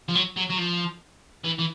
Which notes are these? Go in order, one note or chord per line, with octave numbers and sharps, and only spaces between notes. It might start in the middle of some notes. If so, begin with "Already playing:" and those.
F3
F#3
F#3
F#3
F3
E3
E3